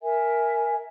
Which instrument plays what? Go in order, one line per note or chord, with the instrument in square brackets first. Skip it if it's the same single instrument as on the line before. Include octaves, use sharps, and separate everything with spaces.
[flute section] A#4 E5 G#5